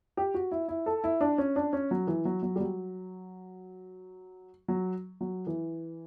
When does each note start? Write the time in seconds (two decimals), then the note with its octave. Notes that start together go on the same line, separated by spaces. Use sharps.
0.17 G4
0.34 F#4
0.51 E4
0.68 E4
0.86 A4
1.04 E4
1.21 D4
1.38 C#4
1.56 D4
1.73 C#4
1.91 F#3
2.07 E3
2.25 F#3
2.43 F#3
2.56 G3
2.60 F#3
4.68 F#3
5.21 F#3
5.47 E3